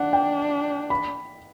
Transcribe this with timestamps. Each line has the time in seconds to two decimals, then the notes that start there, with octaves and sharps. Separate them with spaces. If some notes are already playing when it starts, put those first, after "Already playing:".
Already playing: D4 F#5
0.13 G5
0.90 B5